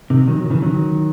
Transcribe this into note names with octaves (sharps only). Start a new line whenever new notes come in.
C3 D#3
D#3 F#3
D#3
C#3 E3
D#3 F#3